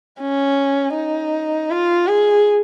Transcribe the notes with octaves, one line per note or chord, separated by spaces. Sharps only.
C#4
D#4
F4
G#4